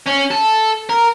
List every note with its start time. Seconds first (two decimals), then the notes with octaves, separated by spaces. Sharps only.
0.06 C#4
0.31 A4
0.89 A#4